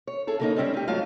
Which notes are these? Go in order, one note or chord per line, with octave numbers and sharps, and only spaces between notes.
C#5
E4 G#4 A4
C#3 A#3 D#4
G3 G#3 C4 C#4 E4
D#4 G4
G#2 F#3 A3 F4 F5